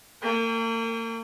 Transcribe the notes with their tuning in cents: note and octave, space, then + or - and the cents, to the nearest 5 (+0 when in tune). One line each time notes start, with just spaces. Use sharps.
A#3 -40 G5 +40